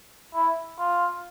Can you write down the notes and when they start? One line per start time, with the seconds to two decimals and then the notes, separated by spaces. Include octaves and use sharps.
0.34 E4
0.79 F4